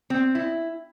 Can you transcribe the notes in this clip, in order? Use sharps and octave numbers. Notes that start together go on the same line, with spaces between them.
C4
E4